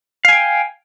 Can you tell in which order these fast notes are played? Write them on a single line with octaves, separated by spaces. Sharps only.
F5 G#5 G5